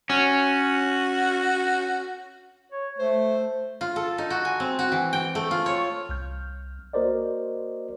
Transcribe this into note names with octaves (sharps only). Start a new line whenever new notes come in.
C#4 F#4
C#5
A3 C5
F4
A4
D#4
F#4
G#5
C4
F#4
E3
G5
A3
F4
C#5
C2 F6 G6
A#3 F#4 A#4 C5 D5 D#5